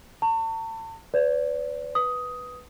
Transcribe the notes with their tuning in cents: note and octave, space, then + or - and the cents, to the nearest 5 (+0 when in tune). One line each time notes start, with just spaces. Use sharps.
A5 +40 C#6 +0
B4 +25 D5 -30
B4 +0 D#6 +10